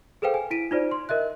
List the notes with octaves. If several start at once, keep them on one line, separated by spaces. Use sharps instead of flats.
G#4 A4 B4 C5 F5 G5
G#5
E4 B6 D7 D#7
D#4 F4 C5 D5
C6
A#4 D#5 E5 F#6